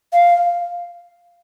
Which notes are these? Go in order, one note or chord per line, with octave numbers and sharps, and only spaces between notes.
F5